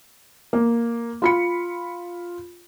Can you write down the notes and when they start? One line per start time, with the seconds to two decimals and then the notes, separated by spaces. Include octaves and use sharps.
0.53 A#3
1.22 F4 B5 C#7